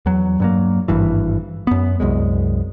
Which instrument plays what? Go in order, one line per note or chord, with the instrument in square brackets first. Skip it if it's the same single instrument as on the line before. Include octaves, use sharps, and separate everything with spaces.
[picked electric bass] E2 F#3
G2 F#3 A#3
G#1 G2 E3
F#2 B3
C2 F#2 G#3